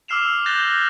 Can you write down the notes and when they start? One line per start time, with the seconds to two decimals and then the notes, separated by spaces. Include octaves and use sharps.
0.08 D6 E6 F6 C7 E7 F7
0.46 F#6 G6 A6 A#6 E7 G7